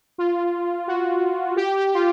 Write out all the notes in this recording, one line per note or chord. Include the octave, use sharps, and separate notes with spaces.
F4
F#4
G4
G4
F4